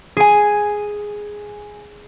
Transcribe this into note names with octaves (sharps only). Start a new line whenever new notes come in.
G#4 G#5